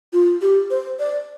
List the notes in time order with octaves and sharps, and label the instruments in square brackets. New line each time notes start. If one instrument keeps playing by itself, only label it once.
[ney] F4
G4
C5
D5